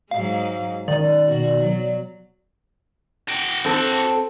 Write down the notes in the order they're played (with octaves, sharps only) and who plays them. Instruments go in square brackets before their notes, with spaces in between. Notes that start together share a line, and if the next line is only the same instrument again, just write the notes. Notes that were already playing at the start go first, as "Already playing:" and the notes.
[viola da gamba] G#2 F#3 G#3 [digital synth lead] F5
[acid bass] D#3 [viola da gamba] C#4 [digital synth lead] D5
[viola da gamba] B2 F#4
F#3
[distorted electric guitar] F#4 G5
[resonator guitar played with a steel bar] C4 A4